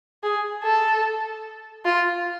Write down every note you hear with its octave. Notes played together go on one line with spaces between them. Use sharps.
G#4
A4
F4